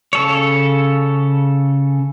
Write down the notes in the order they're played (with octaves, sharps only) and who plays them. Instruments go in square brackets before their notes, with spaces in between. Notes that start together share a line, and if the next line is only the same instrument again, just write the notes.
[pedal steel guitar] C#3 A4 C#5